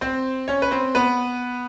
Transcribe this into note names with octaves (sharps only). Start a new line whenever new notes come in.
C4 C5
C#4 C#5
B4
C4 C5
B3 B4